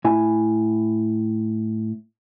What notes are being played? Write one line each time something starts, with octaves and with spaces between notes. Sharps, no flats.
A2 E4 G#5